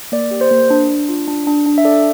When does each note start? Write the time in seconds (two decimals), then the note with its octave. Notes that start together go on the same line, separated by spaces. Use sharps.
0.12 A#3 D5
0.31 G4
0.41 C5
0.51 A#3
0.70 D4
0.89 D4
1.09 F4
1.28 D4
1.47 D4
1.66 D4
1.78 E5
1.85 A4 D5